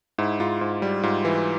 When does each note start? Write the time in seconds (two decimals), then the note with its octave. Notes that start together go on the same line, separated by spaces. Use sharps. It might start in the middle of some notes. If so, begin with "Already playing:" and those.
0.18 G#2 E4
0.40 G#2 F4
0.61 G#2
0.82 G3
1.03 G#2 F4
1.25 E3